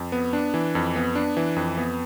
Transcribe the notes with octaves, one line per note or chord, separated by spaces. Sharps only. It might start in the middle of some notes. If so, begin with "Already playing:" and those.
Already playing: F2
B3
D4
E3
F2
B3
D4
E3
F2
B3